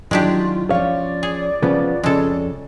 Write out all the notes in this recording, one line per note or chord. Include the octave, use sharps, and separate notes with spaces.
D#3 F#3 G#3 D4 E4 F4 G4
F3 C#4 C#5 D5 F5
G#4
C#3 F3 B3 F4
F2 C#3 G#3 A4